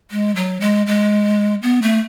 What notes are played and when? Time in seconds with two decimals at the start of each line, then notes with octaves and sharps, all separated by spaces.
0.11 G#3
0.36 F#3
0.61 G#3
0.87 G#3
1.62 B3
1.82 A3